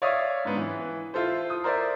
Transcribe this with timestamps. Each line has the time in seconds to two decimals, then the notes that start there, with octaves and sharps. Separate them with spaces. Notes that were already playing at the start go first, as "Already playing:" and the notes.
0.02 C#5 D5 E5 F5 C#6 D#6
0.45 G#2 B3 D4
0.57 E3
1.14 E4 F4 A4 C5
1.50 D#6
1.64 A#4 C5 D5 E5